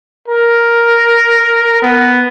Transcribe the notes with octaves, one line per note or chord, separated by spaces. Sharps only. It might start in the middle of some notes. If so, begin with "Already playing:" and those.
A#4
B3